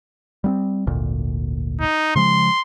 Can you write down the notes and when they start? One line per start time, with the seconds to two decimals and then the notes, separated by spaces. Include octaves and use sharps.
0.44 G3 B3 C4
0.87 G#1 D2 A#2
1.81 D#4
2.16 C#3 F3 G#3 C6